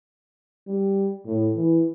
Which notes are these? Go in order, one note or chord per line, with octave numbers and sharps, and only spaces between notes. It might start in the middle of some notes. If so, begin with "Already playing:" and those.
G3
A2
E3